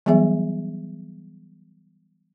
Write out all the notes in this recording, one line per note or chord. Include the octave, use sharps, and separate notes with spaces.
E3 F#3 G3 B3 G#4 E5